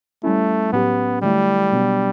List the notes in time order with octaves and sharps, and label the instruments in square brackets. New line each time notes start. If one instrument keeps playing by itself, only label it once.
[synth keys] G3 C#4 E4 [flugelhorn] A3
[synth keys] A2 F#3 C#4 G4 [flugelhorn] B3
[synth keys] D3 F#3 A3 E4 [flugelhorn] G3
[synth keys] B2 F#3 B3 D4